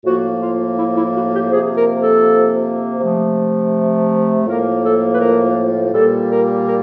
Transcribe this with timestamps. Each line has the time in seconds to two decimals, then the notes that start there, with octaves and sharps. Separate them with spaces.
0.04 A2 F3 A#3 F#4
0.41 F4
0.78 E4
0.97 E4
1.15 F#4
1.34 G4
1.52 C3 F3 A#3 G#4
1.76 A#4
2.00 A4
2.99 C3 F3 A3
4.47 A2 F3 A#3 A#4
4.83 A4
5.13 B4
5.20 A#4
5.93 A#2 G3 A#3 A4
6.31 A#4
6.68 A#4